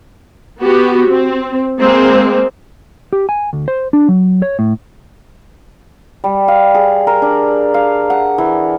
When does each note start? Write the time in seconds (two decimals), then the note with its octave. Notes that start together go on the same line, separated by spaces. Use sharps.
0.59 B3 F#4 G4
1.07 C4
1.81 G#3 A#3 C4
3.13 G4
3.29 G#5
3.53 D2
3.68 C5
3.93 D4
4.09 F#3
4.42 C#5
4.59 A2
6.24 G3
6.48 F5
6.75 G#4
7.07 A#4
7.22 D4
7.74 F5
8.10 F#5
8.38 E3